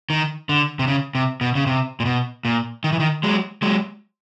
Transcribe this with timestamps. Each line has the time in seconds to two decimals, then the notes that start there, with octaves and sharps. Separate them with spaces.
0.10 D#3
0.49 D3
0.79 C3
0.88 C#3
1.15 C3
1.41 B2
1.55 C#3
1.67 C3
2.00 A#2
2.06 B2
2.45 A#2
2.84 D#3
2.93 E3
3.00 D#3
3.23 F#3 G#3
3.62 F#3 G#3